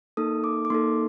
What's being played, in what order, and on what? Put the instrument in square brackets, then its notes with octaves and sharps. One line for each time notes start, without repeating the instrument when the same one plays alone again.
[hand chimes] A#3 D#4 A4 D#6
D6
D6
A#3 D#4 A4 C6